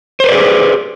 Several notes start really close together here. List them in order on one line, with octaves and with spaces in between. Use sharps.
C5 B4 D5 G#4 G4